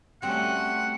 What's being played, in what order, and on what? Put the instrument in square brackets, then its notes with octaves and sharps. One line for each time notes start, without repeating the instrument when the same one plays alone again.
[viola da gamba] G3 A3 C#4 [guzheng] C4 F#4 [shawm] F#5